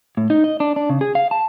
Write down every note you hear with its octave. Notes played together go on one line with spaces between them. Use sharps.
A2
D#4
D#5
D4
D4
C#3
G#4
F5
A5